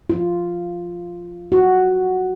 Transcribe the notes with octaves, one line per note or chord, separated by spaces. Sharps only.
F4
F#4